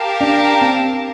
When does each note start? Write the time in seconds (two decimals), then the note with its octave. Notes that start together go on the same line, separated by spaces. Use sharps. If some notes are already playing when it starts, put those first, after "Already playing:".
Already playing: G4 A#4 F5 A5
0.20 D4
0.61 C4